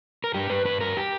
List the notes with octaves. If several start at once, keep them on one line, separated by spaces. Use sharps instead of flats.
A#4
G2 G4
G2 B4
G2 B4
G2 A#4
G4